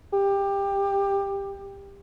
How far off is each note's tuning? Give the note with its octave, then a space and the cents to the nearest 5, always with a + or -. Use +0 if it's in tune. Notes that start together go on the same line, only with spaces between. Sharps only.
G4 +20